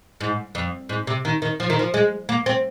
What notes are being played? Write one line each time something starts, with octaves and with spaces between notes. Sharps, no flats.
G#2
F2
G#2
C3
D#3
D#3
F3
D#3
F3
G#3
A#3
C4